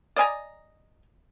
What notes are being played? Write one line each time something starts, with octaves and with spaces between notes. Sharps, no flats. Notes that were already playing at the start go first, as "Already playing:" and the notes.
D5 D#5 G#5 A#5